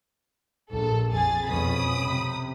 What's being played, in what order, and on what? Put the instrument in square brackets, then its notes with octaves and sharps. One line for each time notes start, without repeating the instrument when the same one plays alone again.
[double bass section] A#1 A#2 [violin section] A4
[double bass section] F2 [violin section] G#4 G#5 A6
[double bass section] F2 B2 C#4 [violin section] B5 D#6
[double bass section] C3